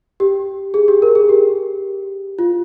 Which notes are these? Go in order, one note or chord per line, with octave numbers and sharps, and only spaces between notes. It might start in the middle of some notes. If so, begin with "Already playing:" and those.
G4
G#4
G4
A#4
G#4
G4
F4